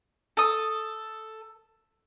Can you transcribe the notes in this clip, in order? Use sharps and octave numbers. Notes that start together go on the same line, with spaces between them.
A4 D#6